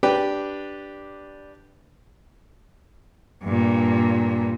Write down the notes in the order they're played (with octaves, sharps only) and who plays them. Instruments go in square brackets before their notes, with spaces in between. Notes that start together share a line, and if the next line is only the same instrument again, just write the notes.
[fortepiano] D4 G4 B4 G5
[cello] G2 A#2